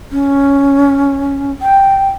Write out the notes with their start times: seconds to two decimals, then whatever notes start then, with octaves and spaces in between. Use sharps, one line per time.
0.12 C#4
1.62 G5